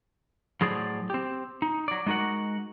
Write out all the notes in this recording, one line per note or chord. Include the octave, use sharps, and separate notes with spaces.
A2 F#3 G#4 C5 D5
C4 G4
D#4
F#3 D5
G#3 D#4 F#4 A#4 F#5